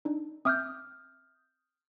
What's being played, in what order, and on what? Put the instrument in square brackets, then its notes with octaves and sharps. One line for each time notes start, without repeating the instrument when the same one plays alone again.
[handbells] D4 D#4
[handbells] C4 E5 D6 [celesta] D#6 F6 G6